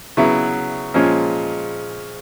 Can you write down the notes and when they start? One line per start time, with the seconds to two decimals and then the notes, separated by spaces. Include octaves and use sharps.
0.17 C#3 F#3 B3 E4
0.94 A#2 F3 G#3 C#4